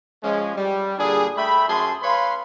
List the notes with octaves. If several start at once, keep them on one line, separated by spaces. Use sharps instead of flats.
F3 G#3 C#4
G3
A#2 D3 G3 D4 G#4
A3 E5 G5 B5
F#2 G#4 A5 C6
B4 C#5 F5 B5 C6